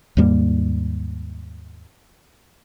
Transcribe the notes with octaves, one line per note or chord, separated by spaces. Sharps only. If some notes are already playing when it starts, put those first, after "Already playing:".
D#2 G#2 G3 A#3